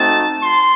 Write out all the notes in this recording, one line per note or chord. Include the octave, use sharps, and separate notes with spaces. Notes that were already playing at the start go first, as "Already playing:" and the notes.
Already playing: A3 C4 D#4 F#4 A5
C6